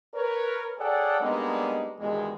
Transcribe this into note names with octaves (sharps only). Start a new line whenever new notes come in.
A#4 B4 C#5
G#4 A4 C#5 D5 F#5 G5
G3 G#3 A#3 B3 D4 D#4
E2 G2 B2 D#3 G#3